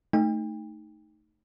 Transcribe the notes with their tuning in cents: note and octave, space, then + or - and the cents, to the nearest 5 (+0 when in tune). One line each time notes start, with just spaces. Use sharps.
A3 +0 D#4 +0 G5 +35